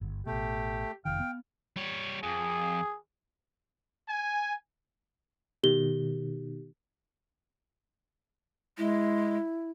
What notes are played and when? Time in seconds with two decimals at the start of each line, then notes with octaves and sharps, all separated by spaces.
0.01 G1
0.26 A1 B2 A3 G4
1.05 F1 D#3 F5 G5
1.20 B3
1.76 G3 C#5
2.23 F2 G#4
4.08 G#5
5.63 B2 D#3 G4 G7
8.78 G#3 E4